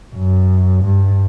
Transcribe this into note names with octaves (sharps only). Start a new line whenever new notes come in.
F#2
G2